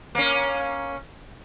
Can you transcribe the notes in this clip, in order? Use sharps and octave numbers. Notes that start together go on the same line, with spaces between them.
A#3 C#4